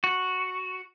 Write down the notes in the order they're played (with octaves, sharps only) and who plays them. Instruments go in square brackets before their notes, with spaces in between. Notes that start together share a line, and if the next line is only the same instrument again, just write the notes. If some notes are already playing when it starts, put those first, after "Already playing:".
[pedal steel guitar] F#4